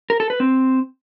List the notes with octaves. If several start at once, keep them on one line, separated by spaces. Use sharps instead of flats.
A#4
A4
B4
C4